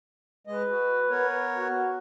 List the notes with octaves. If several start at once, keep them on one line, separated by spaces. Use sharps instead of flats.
G#3 B4 D#5
F#4
B3 A#4 C#5
F#4